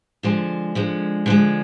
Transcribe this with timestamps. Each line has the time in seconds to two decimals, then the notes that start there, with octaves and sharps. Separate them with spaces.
0.23 D3 F3 G#3
0.75 D3 F3 G#3
1.26 D3 F3 G#3